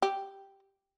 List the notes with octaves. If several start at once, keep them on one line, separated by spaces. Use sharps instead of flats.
G4